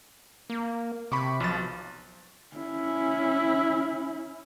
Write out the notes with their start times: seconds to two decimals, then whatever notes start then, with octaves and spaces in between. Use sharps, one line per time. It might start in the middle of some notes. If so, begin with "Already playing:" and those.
0.50 A#3
1.12 C3 B5 C#6 D6
1.40 B1 F3 A6
2.57 C#4 E4